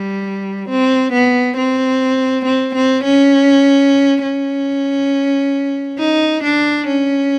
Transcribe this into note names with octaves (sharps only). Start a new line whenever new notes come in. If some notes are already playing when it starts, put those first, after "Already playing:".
Already playing: G3
C4
B3
C4
C4
C4
C#4
C#4
D#4
D4
C#4